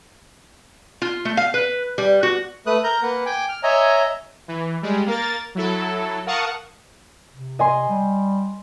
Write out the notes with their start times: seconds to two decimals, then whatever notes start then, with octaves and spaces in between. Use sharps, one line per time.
1.02 F4
1.25 A3
1.37 F5
1.54 B4
1.98 G3
2.23 F#4
2.67 A3 B4 D#6 F#6
2.84 A#4 A#5 G6
3.03 A#3 B4 F#5
3.26 G5 G#5 D6
3.49 F6
3.63 C#5 D#5 E5 G#5 A#5
4.48 E3
4.82 G3 G#3
5.06 A#3 A#4 A6
5.55 F#3 E4 A4
6.26 A#4 F5 F#5 A5 C#6 D#6
7.34 C3
7.59 D#5 G#5 C6
7.89 G3